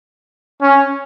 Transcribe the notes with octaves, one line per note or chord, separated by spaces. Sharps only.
C#4